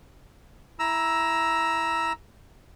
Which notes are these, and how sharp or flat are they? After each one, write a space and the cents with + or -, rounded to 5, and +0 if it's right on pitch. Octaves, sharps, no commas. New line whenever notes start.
E4 +0 A#5 +15 E6 +0